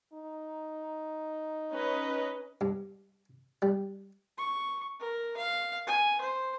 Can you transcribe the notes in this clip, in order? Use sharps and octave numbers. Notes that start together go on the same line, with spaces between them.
D#4
C#4 B4 D#5
G2
G3
C#6
A#4
F5
G#5
C5